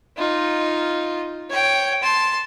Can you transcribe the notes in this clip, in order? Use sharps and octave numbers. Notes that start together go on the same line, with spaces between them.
D#4 F4
C#5 G5
A5 C6